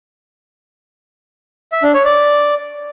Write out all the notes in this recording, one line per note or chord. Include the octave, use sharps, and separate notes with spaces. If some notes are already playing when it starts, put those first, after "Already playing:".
E5
D4
C#5
D5